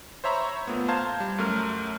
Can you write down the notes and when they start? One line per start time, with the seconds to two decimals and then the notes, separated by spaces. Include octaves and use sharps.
0.24 C5 C#5 E5 A#5 B5 C#6
0.67 A#2 A3 B3
0.88 C5 F5 A5 A#5 G6 G#6
1.20 G3
1.38 F#2 A3 A#4 F6